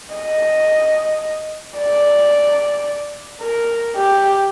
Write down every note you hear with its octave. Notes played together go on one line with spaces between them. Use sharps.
D#5
D5
A#4
G4